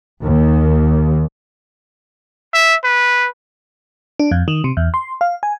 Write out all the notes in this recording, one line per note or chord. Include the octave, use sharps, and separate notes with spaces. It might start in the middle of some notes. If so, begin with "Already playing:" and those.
D#2
E5
B4
D4
F2
D#3
C3
E2
C6
F5
G#5